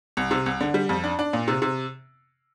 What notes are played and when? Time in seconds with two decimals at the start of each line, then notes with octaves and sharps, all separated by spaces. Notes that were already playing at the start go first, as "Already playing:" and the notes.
0.17 C2
0.31 C3
0.46 C2
0.61 D3
0.74 G3
0.89 F2
1.04 D4
1.19 D4
1.33 A#2
1.48 C3
1.62 C3